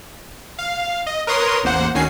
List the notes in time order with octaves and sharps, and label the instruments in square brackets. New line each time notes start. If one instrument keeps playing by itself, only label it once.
[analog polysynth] F5
D#5
A#4 B4 C#5 A#5 C6 D#6
A1 E2 A#3 C5 F#5
D2 D#3 C#4 F#4 G#5 C7